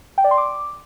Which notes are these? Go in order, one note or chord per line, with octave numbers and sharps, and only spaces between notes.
G5
D5
C6
D6